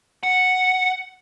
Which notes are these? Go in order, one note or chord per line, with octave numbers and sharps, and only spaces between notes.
F#5